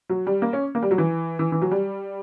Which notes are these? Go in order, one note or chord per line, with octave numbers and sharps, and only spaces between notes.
F#3
G3
A#3
C#4
A#3
G3
F#3
E3
E3
E3
F#3
G3